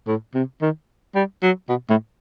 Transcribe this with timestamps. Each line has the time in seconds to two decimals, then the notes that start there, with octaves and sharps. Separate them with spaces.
0.07 A2
0.34 C3
0.61 D#3
1.15 G3
1.42 F#3
1.69 B2
1.89 A2